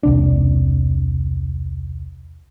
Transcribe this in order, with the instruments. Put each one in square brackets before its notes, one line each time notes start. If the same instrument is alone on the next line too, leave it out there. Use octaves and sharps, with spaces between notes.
[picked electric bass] E1 C2 D4